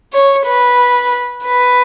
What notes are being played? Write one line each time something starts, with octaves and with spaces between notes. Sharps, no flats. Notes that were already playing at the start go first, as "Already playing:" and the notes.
C#5
B4
B4